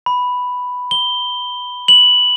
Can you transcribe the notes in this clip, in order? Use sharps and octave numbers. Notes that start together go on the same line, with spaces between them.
B5
G7
F#7